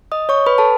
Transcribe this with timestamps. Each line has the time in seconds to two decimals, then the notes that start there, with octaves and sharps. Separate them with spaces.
0.12 D#5 D#6
0.29 C#5 C#6
0.47 B4 B5
0.58 A4 A5